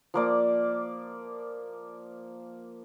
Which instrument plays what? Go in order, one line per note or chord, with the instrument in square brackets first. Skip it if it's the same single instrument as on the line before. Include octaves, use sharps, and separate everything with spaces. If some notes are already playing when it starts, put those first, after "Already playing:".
[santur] F3 A#3 D5